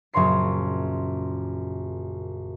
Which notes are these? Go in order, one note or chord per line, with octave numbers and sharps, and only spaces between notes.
A#1 F#2 C#3 C#5 C6 C7